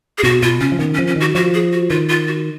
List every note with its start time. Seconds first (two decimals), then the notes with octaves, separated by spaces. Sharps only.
0.18 G#4
0.23 B2 F#4
0.43 B2 F4
0.61 C#3 C#4
0.72 F3
0.79 D#3 B3
0.94 C#4
0.99 F3
1.07 C#4
1.16 D#3 F#4
1.35 F3 F#4
1.54 G#4
1.73 F#4
1.90 D#3 F4
2.09 F4
2.28 F#4